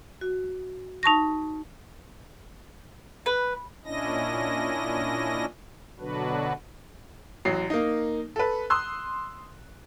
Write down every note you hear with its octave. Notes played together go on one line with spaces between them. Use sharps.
F#4
D#4 A5 C#6 A#6
B4
A#2 C#4 D4 E4 D#5 A#6
B2 D3 F#3 D4 F#4 B4
A1 F#3 C7
A#3 D#4
A4 B4
C6 D#6 E6 F#6